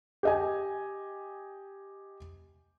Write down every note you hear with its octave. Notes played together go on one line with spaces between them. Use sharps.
G4 D#5 G#5